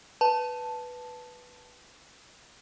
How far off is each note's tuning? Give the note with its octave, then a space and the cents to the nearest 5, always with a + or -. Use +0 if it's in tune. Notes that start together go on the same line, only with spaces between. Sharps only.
B4 +0 A5 +0